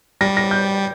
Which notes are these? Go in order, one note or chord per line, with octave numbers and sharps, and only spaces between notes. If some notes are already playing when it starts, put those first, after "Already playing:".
G3 A#6
A#6
G6